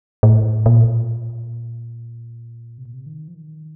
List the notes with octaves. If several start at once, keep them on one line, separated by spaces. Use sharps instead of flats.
A2
A#2
C3
A#2
C3
D#3
F3
D#3